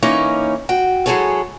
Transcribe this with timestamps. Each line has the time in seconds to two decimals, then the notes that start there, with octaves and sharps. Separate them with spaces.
0.03 E3 A#3 C#4 D#4 C#5
0.69 F#4 G5
1.06 F#3 G#3 E4 G#4 A4 C#5